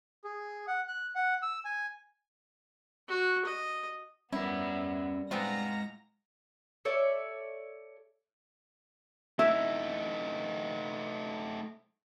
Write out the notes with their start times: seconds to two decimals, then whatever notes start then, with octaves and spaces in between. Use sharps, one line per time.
0.24 G#4
0.68 F#5
0.88 F#6
1.15 F#5
1.42 E6
1.65 G#5
3.08 F#4
3.45 D#5
4.32 G3 B3 C#4 E4 A#4
5.31 G#3 B3 C4 F4 F#5 G#5 A#5 A#6
6.85 A4 C#5 D5 E5
9.39 A3 D#4 E4 E5